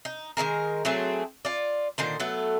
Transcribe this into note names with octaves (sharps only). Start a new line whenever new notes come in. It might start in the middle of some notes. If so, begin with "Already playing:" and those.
D#4
D#3 F3 G#3 A#4
F#3 A3 C4 G#4
F4 D5
A#2 D3 D#3 C5
F#3 A3 B3 A4